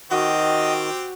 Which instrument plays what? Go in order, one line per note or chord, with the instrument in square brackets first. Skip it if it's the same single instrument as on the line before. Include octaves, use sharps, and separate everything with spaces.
[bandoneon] D#3 [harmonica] C4 G4 [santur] F#4 [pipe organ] D#5